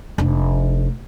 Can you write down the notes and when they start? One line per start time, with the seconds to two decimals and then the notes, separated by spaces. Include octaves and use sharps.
0.18 F1 D4